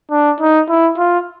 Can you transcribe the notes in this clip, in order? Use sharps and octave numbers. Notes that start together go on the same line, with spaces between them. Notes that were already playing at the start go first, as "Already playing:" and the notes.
D4
D#4
E4
F4